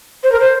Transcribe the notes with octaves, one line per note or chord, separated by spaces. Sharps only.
C5
A#4
C5